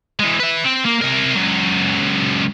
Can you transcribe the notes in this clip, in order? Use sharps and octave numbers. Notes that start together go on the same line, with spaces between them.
E3 G#3
B4 E5
C4
A#3
C3 A#4
C#2 F#3